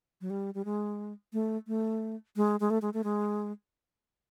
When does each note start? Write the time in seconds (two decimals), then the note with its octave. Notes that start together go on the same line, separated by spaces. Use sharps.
0.21 F#3
0.30 G3
0.54 G3
0.65 G#3
1.33 A3
1.67 A3
2.36 G#3
2.60 G#3
2.70 A3
2.82 G#3
2.94 A3
3.04 G#3